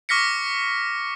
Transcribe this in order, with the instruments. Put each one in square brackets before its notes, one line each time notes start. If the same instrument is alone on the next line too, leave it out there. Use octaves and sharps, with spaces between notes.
[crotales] C#6 D6 F6 A#6 B6 C#7